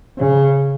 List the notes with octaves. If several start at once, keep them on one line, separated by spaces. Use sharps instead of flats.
C#3